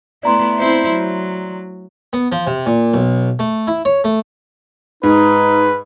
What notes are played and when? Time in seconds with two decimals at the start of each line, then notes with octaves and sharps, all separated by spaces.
0.23 A3 B3 E4 D5 A#5 C6
0.59 C4 E4 C5
0.89 F#3
2.13 B3
2.32 F3
2.47 C3
2.66 A#2
2.94 B1
3.39 A3
3.67 E4
3.85 C#5
4.04 A3
5.03 G#2 D#4 B4